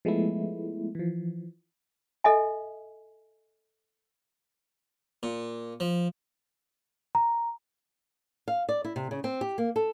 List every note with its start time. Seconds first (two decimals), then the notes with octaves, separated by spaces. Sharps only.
0.05 F3 G#3 A3 B3 E4
0.95 E3 F3
2.24 A4 D#5 E5 G#5
5.23 A#2
5.80 F3
7.15 A#5
8.48 F5
8.69 D5
8.84 E4
8.96 C3
9.11 C#3
9.24 C4
9.41 G4
9.58 A#3
9.76 A4